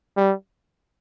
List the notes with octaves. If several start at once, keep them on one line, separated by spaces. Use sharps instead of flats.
G3